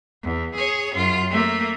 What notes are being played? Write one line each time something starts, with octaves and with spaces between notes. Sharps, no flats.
E2
G#4 C#5
F#2 F4
A3 A#3